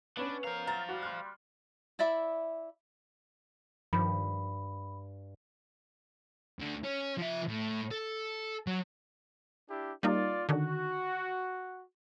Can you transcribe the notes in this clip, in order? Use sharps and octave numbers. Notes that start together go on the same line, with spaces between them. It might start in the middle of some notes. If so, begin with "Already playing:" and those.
B3 C#4 D4 B4
A#4 C5 F5
F#3 A#5 F6 A6
G3 F#4
C6 F6 F#6
E4 D5 E5 B5
G2 D#3 F3 B5
D2 D3
C#4
F3 E5
A2
A4
F#3
D4 E4 G4
G3 A#3 D#4 F4 D5
D3 D#3 F#4